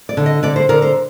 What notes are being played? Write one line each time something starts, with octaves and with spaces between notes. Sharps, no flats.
D5
D3
D#5
D3 D5
C5
D3 A#4
C5